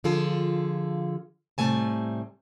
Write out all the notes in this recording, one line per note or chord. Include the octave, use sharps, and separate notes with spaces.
D3 F3 F4 G#4 A4
A2 C3 G3 A3 G#5 A5